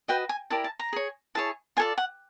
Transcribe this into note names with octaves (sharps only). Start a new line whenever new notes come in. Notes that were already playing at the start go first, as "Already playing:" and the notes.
F#4 B4 D#5 G5
G#5
E4 G4 A#4 D5 A5
A5
A#5
G#4 C#5
E4 G#4 C#5 A5
F4 A4 D5 G#5
F#5